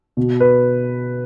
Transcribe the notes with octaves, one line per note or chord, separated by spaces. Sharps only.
B2
B4